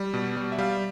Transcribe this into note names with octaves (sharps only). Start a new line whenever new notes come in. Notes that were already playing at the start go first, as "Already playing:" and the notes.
Already playing: G3
B2
G3
E5
G3 F5